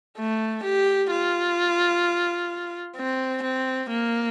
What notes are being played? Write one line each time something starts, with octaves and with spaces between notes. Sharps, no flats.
A3
G4
F4
C4
C4
A#3